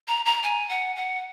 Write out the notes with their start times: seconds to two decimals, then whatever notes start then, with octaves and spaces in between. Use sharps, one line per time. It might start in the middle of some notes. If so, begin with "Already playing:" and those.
0.07 A#5
0.25 A#5
0.43 G#5
0.69 F#5
0.95 F#5